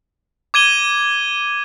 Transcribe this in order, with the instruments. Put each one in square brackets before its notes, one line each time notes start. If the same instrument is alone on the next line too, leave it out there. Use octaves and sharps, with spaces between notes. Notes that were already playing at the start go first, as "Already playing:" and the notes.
[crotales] D6 G#6 D#7 G7